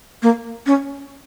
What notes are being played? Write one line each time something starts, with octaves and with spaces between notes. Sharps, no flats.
A#3
C#4